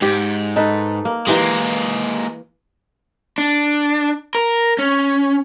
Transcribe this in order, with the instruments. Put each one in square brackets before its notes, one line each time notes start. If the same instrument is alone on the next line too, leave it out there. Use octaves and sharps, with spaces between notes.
[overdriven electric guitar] G#2 [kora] G4
[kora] D#4 A4 B4
A#3
[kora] E3 G4 A#4 [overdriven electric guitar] G#3 A#3
[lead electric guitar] D4
A#4
C#4